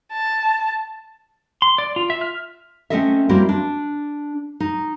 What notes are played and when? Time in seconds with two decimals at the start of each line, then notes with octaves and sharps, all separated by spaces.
0.12 A5
1.62 C6
1.78 D5
1.96 F4
2.10 E5
2.21 F6
2.90 A3 C4 C#4 A4 D#5 E5
3.29 G3 A#3 C4 E4 F#4
3.49 D4
4.60 D#4